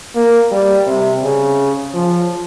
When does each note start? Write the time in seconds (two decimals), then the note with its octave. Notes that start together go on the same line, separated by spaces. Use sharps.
0.15 A#3
0.51 G3
0.87 C3
1.23 C#3
1.94 F3